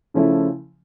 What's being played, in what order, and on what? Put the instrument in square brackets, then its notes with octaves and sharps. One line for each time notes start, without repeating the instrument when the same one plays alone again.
[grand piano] C#3 F3 A3 C#4 E4